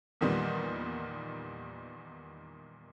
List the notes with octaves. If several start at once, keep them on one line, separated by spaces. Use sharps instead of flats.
E2 A#2 D#3 G3 B3